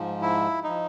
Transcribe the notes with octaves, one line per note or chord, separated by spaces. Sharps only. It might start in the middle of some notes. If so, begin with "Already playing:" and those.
Already playing: G#2 F3
E4
F3 D#4